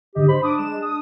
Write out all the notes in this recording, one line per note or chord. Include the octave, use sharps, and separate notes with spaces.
G#2 D3 G4 D#5
C5 B5
D4 D6 D#6
G#3 E7
D#6